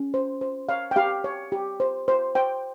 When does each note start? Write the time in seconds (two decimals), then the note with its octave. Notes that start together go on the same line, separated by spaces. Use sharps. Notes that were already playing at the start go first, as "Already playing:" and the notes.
Already playing: C#4
0.14 C5
0.41 C5
0.69 C#5 F5
0.91 G5
0.96 G4 F5
1.24 C#5
1.52 G4
1.80 C5
2.08 C5
2.35 C5 G5